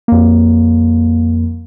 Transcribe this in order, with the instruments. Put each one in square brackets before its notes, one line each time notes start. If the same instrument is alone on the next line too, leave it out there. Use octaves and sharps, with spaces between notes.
[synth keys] F2 A#3